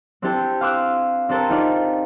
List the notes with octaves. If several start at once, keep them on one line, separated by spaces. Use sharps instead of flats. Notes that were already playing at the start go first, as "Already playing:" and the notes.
C4 D4 E4 G4 A4
F5 C6 D6 E6 F#6
C4 D4 G4 A4 A#4 C5
D#4 F4 D5